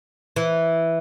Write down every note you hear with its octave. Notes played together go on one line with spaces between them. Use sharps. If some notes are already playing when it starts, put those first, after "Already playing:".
E3